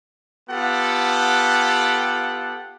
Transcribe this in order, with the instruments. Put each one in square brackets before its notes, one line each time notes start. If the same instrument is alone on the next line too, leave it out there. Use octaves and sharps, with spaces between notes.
[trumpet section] B3 F4 G4 A4 F#5